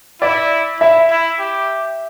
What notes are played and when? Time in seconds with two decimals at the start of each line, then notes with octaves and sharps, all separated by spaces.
0.21 E4 D5
0.80 E4 E5
1.10 E4
1.39 G4